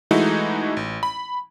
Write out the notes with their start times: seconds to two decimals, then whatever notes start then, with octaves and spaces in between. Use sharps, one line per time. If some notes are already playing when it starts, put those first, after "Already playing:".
0.11 E3 G#3 A3 D#4 E4 F#4
0.77 A1
1.03 B5